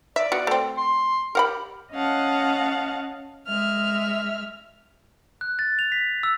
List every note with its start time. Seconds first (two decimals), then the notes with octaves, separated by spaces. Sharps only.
0.16 D5 E5
0.32 B3 F#4
0.47 A3 C4
0.78 C6
1.35 G4 A#4 F#5 B5
1.92 C#4 D#5 F5 F#5 A5
3.47 G#3 E5 F6
5.41 F#6
5.59 A6
5.79 F7
5.92 B6
6.23 E6